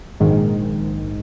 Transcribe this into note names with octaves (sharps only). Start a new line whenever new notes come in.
A#1 G#2 D#3 G#3